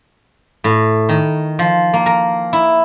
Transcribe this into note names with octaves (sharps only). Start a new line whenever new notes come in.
A2
D#3
F3
A#3
A#4
E4